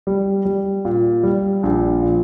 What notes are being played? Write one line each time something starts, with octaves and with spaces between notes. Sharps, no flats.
G3
G3
A#2
G3
A#1
A#2